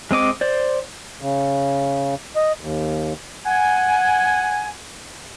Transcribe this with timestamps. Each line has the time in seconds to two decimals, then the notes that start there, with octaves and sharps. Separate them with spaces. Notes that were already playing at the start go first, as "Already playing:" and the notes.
0.11 G#3 C4 D#5 D6
0.41 C5 D5
1.21 C#3
2.36 D#5
2.61 D#2
3.46 F#5 G#5